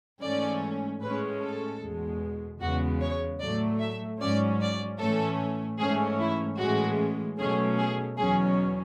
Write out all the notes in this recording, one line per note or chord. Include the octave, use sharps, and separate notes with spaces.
G#2 E3 A3 C#4 D5
A2 G#3 C#4 B4
A4
E2 B2 G#3
E2 C#3 G#3 B3 F#4
C#5
A2 F#3 A3 D5
E5
G#2 F#3 C#4 D5
D5
A2 E3 A3 C#4 A4
G#2 E3 A3 C#4 G#4
E4
A2 E3 G#3 C#4 F#4
B2 F#3 A3 C#4 G#4
G#4
E2 B2 F#3 C#4 G#4